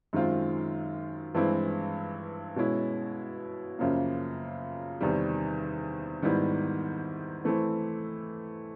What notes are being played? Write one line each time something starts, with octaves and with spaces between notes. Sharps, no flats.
F#2 D#3 G#3 C4 F4
G2 E3 G#3 C4 E4
B2 G#3 C#4 E4
F#2 C#3 F3 A#3
E2 C3 D#3 G3
G#2 D#3 G3 B3 E4
E3 A3 C4 E4